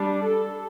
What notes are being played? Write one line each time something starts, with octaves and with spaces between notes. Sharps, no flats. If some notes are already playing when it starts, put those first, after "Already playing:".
Already playing: G3 D4
A4